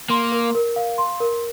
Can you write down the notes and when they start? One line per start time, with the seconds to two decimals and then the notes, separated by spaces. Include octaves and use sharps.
0.10 A#3 C6
0.32 A#4
0.55 A#4
0.76 F5
0.98 C6
1.20 A#4